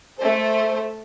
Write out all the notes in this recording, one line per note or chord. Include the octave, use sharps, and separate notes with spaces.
A3 A4 C5